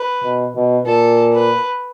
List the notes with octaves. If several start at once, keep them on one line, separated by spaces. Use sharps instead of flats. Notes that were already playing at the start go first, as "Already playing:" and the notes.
Already playing: B4
B2
B2
A#2 A4
B4